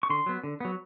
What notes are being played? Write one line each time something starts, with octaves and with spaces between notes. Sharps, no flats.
C#6
D3 C6
F#3 B3
D3
F#3 B3